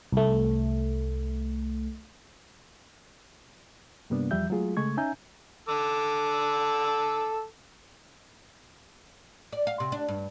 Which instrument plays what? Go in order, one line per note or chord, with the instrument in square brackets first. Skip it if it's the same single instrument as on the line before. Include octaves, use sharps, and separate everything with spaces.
[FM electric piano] C2 A3
[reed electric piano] G2 C3 G3 A#3 B3 D4
E2 F3 G3 E5 G6
F#3 G#3 A3 F4 G#4
C#3 G#3 A3 C#6 G#6
C#4 D#4 E5 G#5 A#5 G6
[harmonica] A4 D6 E6
[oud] D5
F5
C3
D4
G2